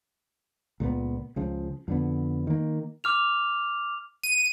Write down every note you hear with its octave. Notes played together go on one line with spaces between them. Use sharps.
C#2 A#2 A3 B3
C#2 C#3 F3
F2 D3 B3
D#3 A#3
D6 F6 F7
D#7